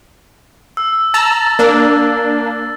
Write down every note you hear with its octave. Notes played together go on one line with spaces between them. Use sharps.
E6
A5 A#5 E6 A6
A#3 D4